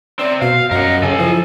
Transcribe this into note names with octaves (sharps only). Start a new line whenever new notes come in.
C3 C4 D5
B2 F#4 F5
F#2 A#4 D#5 F#5
C#3 A4 G#5
F3 E4